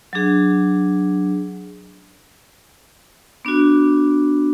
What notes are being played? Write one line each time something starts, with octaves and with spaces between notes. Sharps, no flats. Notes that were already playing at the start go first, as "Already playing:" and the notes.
F#3 D4 G#4
B3 D4 F#4